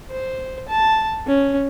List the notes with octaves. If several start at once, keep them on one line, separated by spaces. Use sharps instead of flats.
C5
A5
C#4